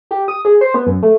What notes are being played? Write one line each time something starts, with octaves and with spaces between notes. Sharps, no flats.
G4
D#6
G#4
C5
B3
F#2
A3